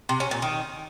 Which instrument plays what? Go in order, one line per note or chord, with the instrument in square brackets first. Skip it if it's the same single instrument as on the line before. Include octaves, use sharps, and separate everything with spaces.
[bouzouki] C3
C#4
A#2
D#3